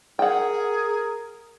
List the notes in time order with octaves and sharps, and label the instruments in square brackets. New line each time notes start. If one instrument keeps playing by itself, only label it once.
[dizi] G#4 [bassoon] A#4 [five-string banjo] F#5 G5